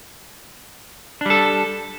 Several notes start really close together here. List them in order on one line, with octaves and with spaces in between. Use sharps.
D4 G3 A4